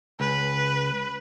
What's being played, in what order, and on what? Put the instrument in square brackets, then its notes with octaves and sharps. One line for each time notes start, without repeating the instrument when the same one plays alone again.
[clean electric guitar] C#2 [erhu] B4